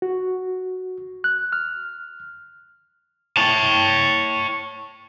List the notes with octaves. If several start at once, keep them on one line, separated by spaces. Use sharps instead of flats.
F#4
F#6
F6
C#5 A5